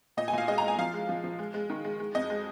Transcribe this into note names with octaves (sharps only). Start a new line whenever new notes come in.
A#2 D#5
G#5
A#2 F5
G#3 D#5
A#5
G#3 G#5
F3 F5
G#3
F3
F3
G#3
G#3
D#3
G#3
G#3
F2 D#5
G#3